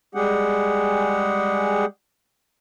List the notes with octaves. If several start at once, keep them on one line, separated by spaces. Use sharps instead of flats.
G3 G#3 G4 G#4 F#5